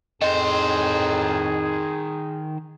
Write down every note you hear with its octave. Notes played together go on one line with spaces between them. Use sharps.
F2 A2 D#3 G#4 C5 D#5